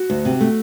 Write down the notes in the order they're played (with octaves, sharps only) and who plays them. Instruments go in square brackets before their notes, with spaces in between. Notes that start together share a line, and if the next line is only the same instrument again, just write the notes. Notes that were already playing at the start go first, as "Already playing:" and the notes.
Already playing: [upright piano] F#4
[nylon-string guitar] D2
C3
A3